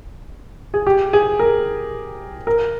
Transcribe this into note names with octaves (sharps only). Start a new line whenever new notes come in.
G#4
G4
G#4
A#4
A#4